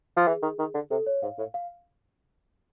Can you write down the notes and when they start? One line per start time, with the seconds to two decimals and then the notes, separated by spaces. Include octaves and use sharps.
0.17 F3
0.27 E3 G#4
0.42 D#3
0.59 D#3
0.74 D3
0.91 C3 A4
1.07 C#5
1.23 G#2 F5
1.38 A2
1.54 F5